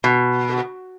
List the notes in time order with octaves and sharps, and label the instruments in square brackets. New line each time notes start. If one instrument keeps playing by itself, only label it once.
[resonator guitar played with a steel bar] B2